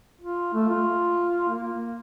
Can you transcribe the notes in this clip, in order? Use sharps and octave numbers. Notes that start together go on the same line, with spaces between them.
F4
A3
F4
A#3